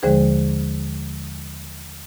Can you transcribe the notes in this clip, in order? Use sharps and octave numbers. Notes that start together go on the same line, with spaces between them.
D#2 D3 F3 G#3 G#4 C5